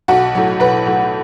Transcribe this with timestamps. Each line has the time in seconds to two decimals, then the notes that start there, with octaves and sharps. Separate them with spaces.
0.08 B1 F#4
0.35 A2 F#3
0.60 B1 B4
0.86 A2 F#3